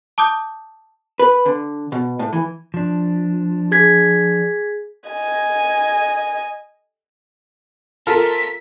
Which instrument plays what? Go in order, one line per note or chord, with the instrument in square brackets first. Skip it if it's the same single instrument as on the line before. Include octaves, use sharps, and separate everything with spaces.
[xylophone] A5 D6 D#6 G6
[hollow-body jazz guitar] B4
D3
B2
A2
E3
[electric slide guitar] F3 D4
[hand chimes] G#4 G#6 B6
[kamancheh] D#5 G#5
[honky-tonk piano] F4 A4 A#4 [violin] B6